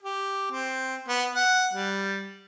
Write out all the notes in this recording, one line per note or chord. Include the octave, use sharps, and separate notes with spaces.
G4
C4
B3
F#5
G3